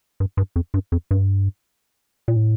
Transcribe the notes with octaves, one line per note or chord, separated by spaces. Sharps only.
G2
G2
F2
G2
F2
G2
A#2
A2